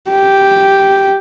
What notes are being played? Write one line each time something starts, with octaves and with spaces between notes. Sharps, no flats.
G4